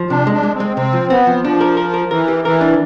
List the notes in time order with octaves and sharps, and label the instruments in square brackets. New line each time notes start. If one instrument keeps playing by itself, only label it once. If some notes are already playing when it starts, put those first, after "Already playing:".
Already playing: [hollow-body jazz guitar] F3
[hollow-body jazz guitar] C3 [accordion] D4
[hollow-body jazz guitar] G#3
[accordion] D4
[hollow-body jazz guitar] G#3
[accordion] C4
[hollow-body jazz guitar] G#3
[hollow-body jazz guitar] C3 [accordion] C4
[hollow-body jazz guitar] F3
[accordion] B3 [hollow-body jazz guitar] C4
[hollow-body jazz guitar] F3
[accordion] F3 [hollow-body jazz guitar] D4
[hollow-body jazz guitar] A#4
A#4
A#4
[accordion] E3 [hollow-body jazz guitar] A#4
[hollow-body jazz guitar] G4
[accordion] E3 [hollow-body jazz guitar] A#4
[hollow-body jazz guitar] D4